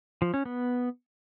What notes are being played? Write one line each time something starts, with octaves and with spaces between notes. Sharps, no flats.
F3
C#4
B3